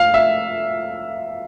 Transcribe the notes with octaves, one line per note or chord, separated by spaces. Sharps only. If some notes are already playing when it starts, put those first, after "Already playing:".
Already playing: F5
E5